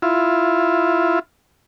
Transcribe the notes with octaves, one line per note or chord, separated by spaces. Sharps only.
E4 F4